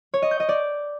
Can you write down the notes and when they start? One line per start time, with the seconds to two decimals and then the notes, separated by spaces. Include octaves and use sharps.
0.14 C#5
0.22 D#5
0.31 G6
0.40 D#5
0.49 D5